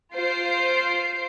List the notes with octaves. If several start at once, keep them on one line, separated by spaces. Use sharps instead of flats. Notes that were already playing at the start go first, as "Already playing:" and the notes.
F4 C5 C7 D7